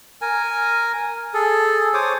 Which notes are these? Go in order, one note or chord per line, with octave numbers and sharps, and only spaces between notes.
A#4 G#5
G#4 A4
C5 C#5 D6 D#6